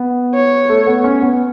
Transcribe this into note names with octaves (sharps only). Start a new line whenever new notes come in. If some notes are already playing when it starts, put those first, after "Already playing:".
Already playing: B3
C#5
A3
B3
C#4
B3